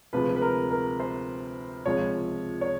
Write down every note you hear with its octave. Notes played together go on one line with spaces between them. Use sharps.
D2 C3 F3 G#3 B4
B4
A#4
A#4
C5
C#2 C3 F3 G#3 C#5
C#5